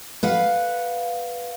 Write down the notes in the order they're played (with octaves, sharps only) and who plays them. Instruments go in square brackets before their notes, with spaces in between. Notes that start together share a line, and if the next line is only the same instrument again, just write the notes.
[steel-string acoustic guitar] B4 F5 F#5